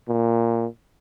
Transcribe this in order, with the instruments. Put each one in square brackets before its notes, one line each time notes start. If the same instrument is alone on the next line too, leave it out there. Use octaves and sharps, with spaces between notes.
[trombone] A#2